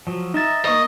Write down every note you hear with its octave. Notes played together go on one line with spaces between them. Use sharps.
F3 F#3
D#4 D#5 E5 A6
A#3 D#5 C#6 D#6